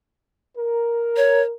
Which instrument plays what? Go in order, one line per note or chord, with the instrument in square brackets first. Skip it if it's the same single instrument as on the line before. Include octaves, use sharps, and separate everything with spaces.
[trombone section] A#4
[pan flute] C#5